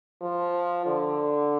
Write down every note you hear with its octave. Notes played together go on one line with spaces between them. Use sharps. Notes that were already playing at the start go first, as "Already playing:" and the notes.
F3
D3